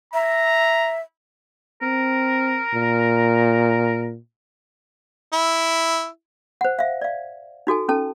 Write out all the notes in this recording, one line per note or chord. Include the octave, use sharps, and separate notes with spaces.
E5 A#5
C4 A#4
A#2
E4
C5 F#5
E5 F5
D5 F5
D#4 F#4 A4 G#5
C#4 A4 A5